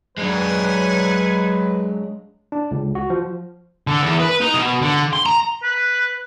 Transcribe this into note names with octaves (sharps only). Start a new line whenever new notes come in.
F#3 G#3 D4 B4 F#5 G#5
D4
C#2
F#4
F3
D3
E2
B4
D#4
B2
D3
C6
A#5
B4